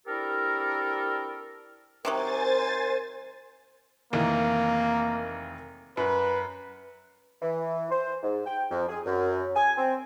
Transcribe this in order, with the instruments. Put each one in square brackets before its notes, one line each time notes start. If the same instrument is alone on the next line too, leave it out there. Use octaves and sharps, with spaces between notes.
[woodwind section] C4 D4 E4 G4 A4 A#4
[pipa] C3 D#3 F#3 [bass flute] A#4 [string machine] C5 G#5 A6
[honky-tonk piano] F1 D#3 E3 [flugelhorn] A#3
[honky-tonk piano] F#2 [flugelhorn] B4
[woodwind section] E3
C5
G#2
G5
F2
G#4
F#2
G#5
C4